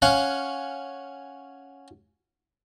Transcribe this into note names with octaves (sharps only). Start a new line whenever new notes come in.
C#4 F5 F#5